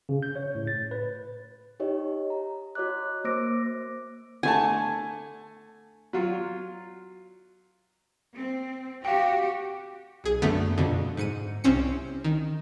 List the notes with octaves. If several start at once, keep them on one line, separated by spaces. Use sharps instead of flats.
C#3
G6
C#5
A2
A6
B4
D#4 G4 C#5 D#5
A#5
F#4 C#5 D#5 D6 F#6
A#3 C5 D6 E6 A#6 D7
D3 A3 G#5 A5
F#3 F4
C4
F#4 G4 F5 G5
B1 G#4
F#2 D3 A3 B3
F2 B2 D3
G#2 C#7 D#7
C2 C4 C#4 C#7
D#3